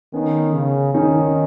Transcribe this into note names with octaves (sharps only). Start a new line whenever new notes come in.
D#3 B3 C#4
C#3
D#3 C#4 D#4